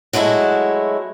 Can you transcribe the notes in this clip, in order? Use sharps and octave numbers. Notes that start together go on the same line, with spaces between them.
F#3 G#3 A3 E4 F#4